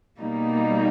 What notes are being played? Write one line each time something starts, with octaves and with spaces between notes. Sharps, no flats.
B2 G3 A#3 D#4